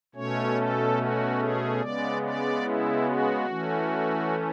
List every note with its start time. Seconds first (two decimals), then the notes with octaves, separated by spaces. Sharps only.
0.15 B2 A3 C#4 C#5
0.56 A4
0.97 F#4
1.40 G#4
1.80 C#3 G#3 B3 D5
2.22 D5
2.63 E4
3.05 F#4
3.47 E3 A3 C#4